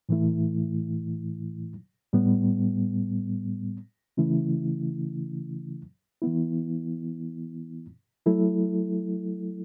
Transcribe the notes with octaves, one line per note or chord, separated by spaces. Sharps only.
A2 E3 A3 E4
A2 G3 B3
C#3 E3 A3 C#4 E4
E3 B3 E4
F#3 A3 E4 A4